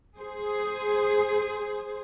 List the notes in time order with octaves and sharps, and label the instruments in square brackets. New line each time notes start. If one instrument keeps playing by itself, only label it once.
[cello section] G#4 C5